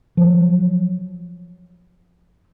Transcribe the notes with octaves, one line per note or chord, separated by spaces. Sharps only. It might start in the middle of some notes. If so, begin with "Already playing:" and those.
F3 F#3